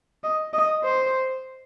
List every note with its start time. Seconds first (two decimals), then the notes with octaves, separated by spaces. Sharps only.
0.24 D#5
0.53 D#5
0.84 C5